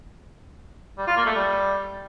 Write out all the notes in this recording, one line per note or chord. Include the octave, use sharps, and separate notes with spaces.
G3
F4
A#3
A3
G3